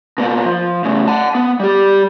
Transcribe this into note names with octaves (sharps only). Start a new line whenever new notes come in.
B2 A#3
F3
A2 C#3
F#5 A5
B3
G3 G4